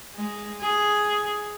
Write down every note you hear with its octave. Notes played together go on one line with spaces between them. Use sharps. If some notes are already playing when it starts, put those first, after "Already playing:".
G#3
G#4